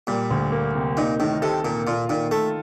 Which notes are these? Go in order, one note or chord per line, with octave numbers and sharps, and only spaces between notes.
A#2 G3
D2
A#3
C3
A#2 D#4
A2 D#3
C3 A4
A#2 A#3
A#2 F4
A#2 D#3
A3 A4